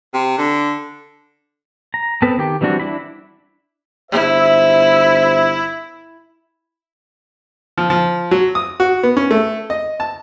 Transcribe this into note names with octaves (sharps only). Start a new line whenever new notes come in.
C3
D3
A#5
B3 C4 A4 B4
D#3 G4
E3 G3 C4 D4 F#4
D4 E4 B5
G1 E4 C5 E5
F3
F3
F#3
D#6
F#4
B3
C#4
A3
D#5
A5